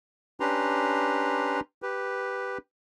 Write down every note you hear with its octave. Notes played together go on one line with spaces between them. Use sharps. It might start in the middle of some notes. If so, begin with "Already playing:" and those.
C#4 D4 G4 B4 A#5 C6
G4 B4